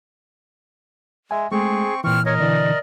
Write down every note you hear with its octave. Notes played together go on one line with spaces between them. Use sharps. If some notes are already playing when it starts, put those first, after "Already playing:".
G#3 E5 G#5
G#3 A3 C4 G#4 C#6
A#2 E3 C4 C#6 F6
A#4 C#5 D#5
B2 D3 E3 D5